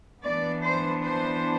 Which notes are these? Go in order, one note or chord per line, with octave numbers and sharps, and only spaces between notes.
E3 B3 D4 D5
C5
C5